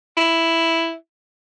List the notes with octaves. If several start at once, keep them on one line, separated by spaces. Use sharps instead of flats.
E4